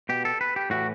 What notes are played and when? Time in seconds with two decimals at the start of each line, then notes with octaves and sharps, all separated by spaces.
0.09 B2 G4
0.25 A4
0.41 B4
0.56 G4
0.70 A2 E3 F#4